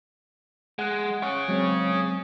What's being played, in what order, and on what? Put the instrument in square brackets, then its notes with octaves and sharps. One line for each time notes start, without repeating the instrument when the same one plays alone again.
[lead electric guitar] G#3 [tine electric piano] F#5 F#6
[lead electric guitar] G#4 C#5 [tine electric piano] C#6
[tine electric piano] F#3 G#3 C4